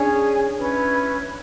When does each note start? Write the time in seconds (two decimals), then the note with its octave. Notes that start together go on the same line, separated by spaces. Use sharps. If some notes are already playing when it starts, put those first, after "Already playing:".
Already playing: C#4 D4 G#4 C#5 G#5
0.58 C#4 E4 B4